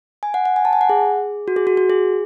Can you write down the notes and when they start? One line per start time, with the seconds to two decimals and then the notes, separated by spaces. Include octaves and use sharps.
0.23 G#5
0.34 F#5
0.45 F#5
0.56 G#5
0.65 A5
0.73 G#5
0.81 F#5
0.90 G#4
1.48 F#4
1.56 G#4
1.67 F#4
1.77 F#4
1.90 G#4